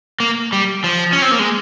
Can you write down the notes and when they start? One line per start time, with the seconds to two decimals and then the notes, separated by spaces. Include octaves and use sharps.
0.20 A#3
0.53 G3
0.84 F3
1.13 C#4
1.22 C4
1.31 A#3
1.39 G#3